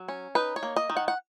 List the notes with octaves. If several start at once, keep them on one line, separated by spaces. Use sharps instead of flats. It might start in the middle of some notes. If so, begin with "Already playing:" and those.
Already playing: F#3
C#4
D#4 B4
C#5
A#3
D#5
D#3
F#5
F#5